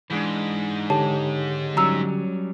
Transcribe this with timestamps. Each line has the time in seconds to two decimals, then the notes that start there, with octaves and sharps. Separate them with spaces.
0.10 G#2 E3 G#3 D4
0.90 D3 G4 C#5 A5
1.77 F#3 G3 C#4 A#5 E6